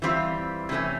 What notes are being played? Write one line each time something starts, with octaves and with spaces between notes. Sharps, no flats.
E3 G3 C4 F4
C3 E3 A3 C#4